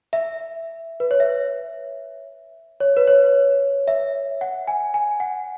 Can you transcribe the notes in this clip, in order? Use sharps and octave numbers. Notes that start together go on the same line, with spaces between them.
E5
B4
C#5
E5
C#5
B4
C#5
E5
F#5
G#5
G#5
F#5